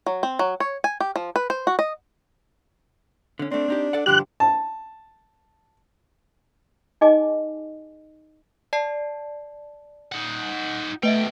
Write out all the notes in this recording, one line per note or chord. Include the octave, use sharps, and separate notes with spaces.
F#3
C4
F#3
C#5
G#5
G4
F3
B4
C5
F#4
D#5
D3 C#4
A3 C4 D4
C4 D#4 G4
A4 D5 F#5
G2 D3 F3 G4 F#6
A5
D#4 G#4 D#5 G#5 A5 D6
D5 A5 C7
D#4 F#5
B2 A3 B4 D#5 E5 G5